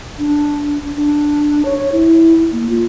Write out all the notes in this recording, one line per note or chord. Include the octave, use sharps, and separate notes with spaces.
D4
D4
C#5
E4
A#3
F4